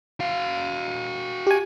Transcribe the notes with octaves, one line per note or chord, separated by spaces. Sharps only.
F#4 F5
G4 G#5